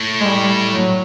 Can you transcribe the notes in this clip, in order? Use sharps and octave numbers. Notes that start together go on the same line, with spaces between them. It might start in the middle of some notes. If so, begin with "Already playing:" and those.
Already playing: A2
G#3
G3
F#3